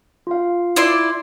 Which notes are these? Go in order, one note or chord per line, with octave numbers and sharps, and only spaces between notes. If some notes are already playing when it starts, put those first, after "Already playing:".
F4 F5
E4 D5 C6